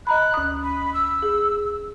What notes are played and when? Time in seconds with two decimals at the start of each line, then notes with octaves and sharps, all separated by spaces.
0.07 D#5 A#5 B5 F#6
0.34 D2 D#6
0.63 B5
0.94 E6
1.23 G#4